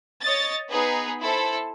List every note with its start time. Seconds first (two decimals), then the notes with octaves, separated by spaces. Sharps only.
0.21 C#5 D#5 A6
0.70 B3 D#4 G#4 B4
1.21 E4 A4 C5